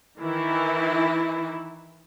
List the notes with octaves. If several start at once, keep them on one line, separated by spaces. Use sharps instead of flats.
D#3 E3 E4